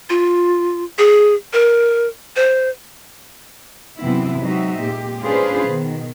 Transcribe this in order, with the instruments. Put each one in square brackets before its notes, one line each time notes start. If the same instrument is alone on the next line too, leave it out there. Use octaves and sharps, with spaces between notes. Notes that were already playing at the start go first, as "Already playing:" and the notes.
[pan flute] F4
G#4
A#4
C5
[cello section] F#2 C3 E3 B3 C4 E4
F#3 G#3 C4 D#4 F#4 E5
A#2 G#3 G4
C#4 D4 F4 G#4 B4 C5
B2 D#3